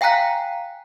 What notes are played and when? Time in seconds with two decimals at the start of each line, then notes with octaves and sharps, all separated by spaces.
0.01 F5 G5 G#5 A#5 F#6 B6